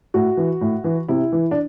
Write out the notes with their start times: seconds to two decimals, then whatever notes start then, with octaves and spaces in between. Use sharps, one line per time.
0.14 A2 F#4
0.37 E3
0.61 A2
0.84 E3
1.09 C3 E4
1.32 E3
1.51 D4